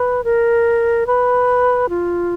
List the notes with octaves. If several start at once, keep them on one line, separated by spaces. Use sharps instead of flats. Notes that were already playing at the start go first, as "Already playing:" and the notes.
Already playing: B4
A#4
B4
F4